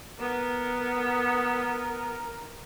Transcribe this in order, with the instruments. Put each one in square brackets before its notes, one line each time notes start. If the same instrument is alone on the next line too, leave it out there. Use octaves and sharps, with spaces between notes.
[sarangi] B3 [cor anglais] A#4